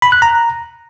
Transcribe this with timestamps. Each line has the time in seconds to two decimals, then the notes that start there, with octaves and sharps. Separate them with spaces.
0.02 B5
0.12 F#6
0.22 A#5